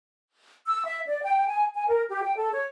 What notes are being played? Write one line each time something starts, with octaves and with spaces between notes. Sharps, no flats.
E6
E5
D5
G5
G5
G#5
G#5
A#4
G4
G5
A4
C#5